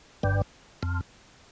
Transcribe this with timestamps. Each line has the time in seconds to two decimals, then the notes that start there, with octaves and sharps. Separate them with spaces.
0.23 G1 G2
0.83 F2